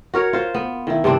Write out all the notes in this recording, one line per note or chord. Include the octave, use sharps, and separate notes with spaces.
F#4 A#4 C#5
F4 C5
B3
D#3 E4
G2 C3 C4 D4